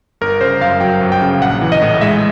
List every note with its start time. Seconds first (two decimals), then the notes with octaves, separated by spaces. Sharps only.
0.21 G1 A#4
0.41 C#3 C5
0.61 F#2 F5
0.80 F#3 G5
1.01 G1
1.12 G5
1.22 C#3
1.41 A#1 F#5
1.61 E3
1.72 D#5
1.82 A2
2.01 G#3 E5